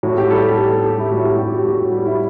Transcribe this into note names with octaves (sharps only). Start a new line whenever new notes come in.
A2 F#4
G4
G3 A4
A4
G3 A4
A4
G3 G4
E4
A2 F#4
G4
A2 G4
F#4
A2 F#4
F#4
G3
E4